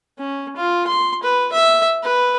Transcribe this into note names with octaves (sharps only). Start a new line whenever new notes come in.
C#4
F4
C6
B4
E5
B4